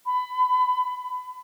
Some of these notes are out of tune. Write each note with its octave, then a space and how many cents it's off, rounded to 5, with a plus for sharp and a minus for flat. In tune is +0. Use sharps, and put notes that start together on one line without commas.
B5 +25